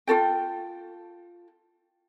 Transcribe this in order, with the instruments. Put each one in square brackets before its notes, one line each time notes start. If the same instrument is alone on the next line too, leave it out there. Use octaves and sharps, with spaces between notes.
[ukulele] F4 F#4 A4 G5